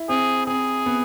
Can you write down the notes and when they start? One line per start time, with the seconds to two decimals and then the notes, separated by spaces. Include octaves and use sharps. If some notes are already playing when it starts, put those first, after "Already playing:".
Already playing: E4
0.09 C4 G#4
0.47 C4 G#4
0.86 B3